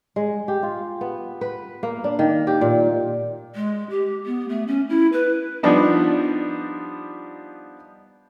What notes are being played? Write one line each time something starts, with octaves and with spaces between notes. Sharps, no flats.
G#3
G4
F4
B3
B4
A#3
D4
D#3
G4
A#2
G#3
G4
B3
A3
C#4
E4
B4
F3 G3 B3 D4 D#4